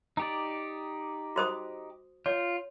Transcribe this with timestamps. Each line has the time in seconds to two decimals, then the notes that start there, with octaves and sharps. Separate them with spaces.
0.17 D#4 G4 D5
1.36 F#4 C5 D#6
2.26 F4 C#5